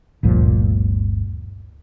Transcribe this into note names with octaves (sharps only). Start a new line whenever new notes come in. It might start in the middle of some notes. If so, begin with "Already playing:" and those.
G1 D2 A#2 F3